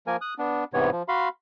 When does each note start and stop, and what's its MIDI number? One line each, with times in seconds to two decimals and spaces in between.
0.07 0.16 53
0.07 0.16 58
0.07 0.16 70
0.07 0.16 80
0.21 0.34 87
0.21 0.34 90
0.38 0.64 59
0.38 0.64 62
0.74 0.90 44
0.74 0.90 48
0.74 0.90 52
0.74 0.90 59
0.74 0.90 73
0.92 1.03 53
1.08 1.29 66
1.08 1.29 77
1.08 1.29 83
1.08 1.29 84